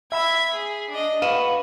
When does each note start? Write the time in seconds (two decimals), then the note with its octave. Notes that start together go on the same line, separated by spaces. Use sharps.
0.12 E5 B5 E6 G#6 B6
0.54 G#4
0.90 D4 D#5
1.22 F#4 B4 F5 D#7 E7